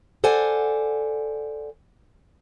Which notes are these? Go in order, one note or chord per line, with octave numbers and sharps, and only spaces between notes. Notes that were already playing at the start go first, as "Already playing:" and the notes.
A4 C5 D5 F#5 G#5